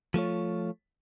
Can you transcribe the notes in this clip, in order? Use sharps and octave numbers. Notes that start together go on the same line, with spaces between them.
F3 A3 F4 C#5